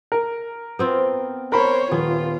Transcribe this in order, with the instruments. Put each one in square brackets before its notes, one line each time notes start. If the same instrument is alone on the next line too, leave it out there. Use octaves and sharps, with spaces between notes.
[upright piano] A#4
[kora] B3 C4 F4
[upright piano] A#4 B5 [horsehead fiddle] C5 C#5
[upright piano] D#1 [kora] B3 [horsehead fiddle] F4